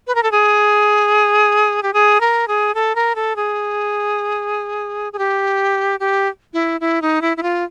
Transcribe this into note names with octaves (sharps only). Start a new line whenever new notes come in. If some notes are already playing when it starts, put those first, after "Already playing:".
B4
A#4
A4
G#4
G4
G#4
A#4
G#4
A4
A#4
A4
G#4
G#4
G4
G4
E4
E4
D#4
E4
E4
F4